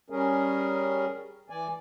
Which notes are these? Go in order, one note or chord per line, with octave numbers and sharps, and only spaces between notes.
G3 C#4 G#4 A#4
E3 D5 G#5